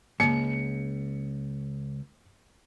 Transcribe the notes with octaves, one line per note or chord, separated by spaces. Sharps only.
C#2 G2 A#3 C#7